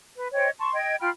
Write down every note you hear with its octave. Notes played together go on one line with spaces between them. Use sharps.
B4
C5 C#5 D#5 G5
A5 C6 C#6
D#5 G5 G#6
F4 G5 B5 F6